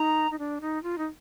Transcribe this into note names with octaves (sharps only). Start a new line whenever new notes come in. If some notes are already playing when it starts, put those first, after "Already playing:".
Already playing: D#4 A#5
D#4
D4
D#4
F4
D#4